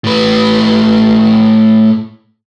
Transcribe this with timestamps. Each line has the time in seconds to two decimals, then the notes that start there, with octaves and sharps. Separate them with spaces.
0.04 A2 B4